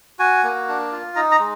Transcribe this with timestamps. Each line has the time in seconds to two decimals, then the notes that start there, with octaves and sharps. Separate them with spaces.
0.19 F#4 G#5
0.44 A#3
0.68 D4
0.92 F4
1.16 D#4 A#5
1.31 A#5
1.40 G#3